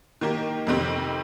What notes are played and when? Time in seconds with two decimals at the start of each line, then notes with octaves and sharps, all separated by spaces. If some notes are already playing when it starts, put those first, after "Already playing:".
0.21 D#3 A#3 G4 A#4
0.67 F2 C3 D#3 C4 G4